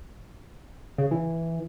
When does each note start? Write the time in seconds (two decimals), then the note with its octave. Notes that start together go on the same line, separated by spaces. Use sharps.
0.98 C#3
1.11 E3